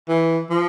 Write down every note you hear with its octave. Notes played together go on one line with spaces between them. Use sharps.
E3
F3